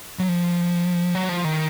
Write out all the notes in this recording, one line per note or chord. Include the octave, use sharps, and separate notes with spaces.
F#3
F3
F#3
F3
D#3